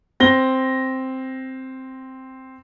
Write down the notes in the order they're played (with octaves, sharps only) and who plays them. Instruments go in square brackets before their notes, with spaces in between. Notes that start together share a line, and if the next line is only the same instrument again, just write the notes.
[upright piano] C4 A#6 G7